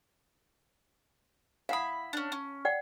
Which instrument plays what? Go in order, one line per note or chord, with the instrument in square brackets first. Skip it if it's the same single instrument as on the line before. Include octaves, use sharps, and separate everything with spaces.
[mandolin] E4 B5 [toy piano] F5 F#5 D#6
[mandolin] C#4 D4
C#4
[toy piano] D5 F#5 G5